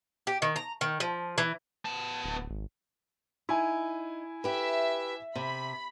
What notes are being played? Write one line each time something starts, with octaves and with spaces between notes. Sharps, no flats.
G4
D#3
A#5
D#3
F3
E3
B3 A5
D1
G#1
D#4 E4 G#5
G4 B4 E5
C3 B5